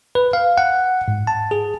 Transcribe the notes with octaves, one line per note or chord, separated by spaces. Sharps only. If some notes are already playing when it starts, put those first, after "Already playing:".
B4
F5
F#5
G#2
A5
G#4